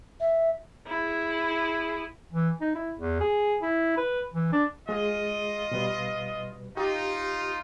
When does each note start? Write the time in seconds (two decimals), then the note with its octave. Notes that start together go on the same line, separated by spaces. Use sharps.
0.20 E5
0.87 E4 G#4
2.33 E3
2.61 D#4
2.75 E4
2.99 E2
3.20 G#4
3.62 E4
3.97 B4
4.34 E3
4.52 D4
4.89 G#3 F4 G#4 D#5
5.71 B2 G3 B4
6.77 D#4 F4 G4